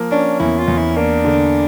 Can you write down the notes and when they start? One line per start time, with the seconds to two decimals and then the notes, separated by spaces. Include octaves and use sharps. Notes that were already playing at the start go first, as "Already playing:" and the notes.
Already playing: F3 A#3
0.11 C#4 D4
0.40 E2 E4
0.59 F4
0.68 E2
0.78 E4
0.96 A#3 D4
1.25 D3